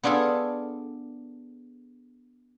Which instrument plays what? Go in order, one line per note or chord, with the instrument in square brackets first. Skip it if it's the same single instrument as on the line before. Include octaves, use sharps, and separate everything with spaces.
[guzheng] B3 D4 F4 G#4 A4